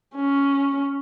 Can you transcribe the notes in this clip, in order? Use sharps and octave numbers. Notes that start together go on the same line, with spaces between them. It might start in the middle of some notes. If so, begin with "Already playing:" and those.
C#4